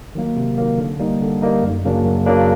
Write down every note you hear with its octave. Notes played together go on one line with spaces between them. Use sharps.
D#3 F#3 A#3
C3
D#3 F#3 A#3
D3
G3 A#3 D#4
D3
G3 A#3 D#4
F#2
C#3 F#3 A#3 D4
F#2
C#3 F#3 A#3 D4